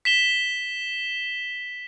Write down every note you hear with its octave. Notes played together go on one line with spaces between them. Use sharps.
B6 E7 G7